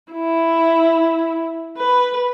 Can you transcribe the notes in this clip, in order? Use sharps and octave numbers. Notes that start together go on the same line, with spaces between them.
E4
B4